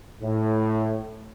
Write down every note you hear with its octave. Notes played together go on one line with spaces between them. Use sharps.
A2